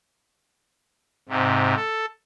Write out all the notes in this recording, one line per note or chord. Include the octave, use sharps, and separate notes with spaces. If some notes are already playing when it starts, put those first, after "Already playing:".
G#2 C3
A4